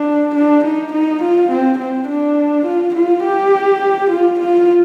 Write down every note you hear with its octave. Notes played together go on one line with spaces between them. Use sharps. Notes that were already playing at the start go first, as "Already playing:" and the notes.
Already playing: D4
D4
D#4
D#4
F4
C4
C4
D4
F4
F4
G4
F4
F4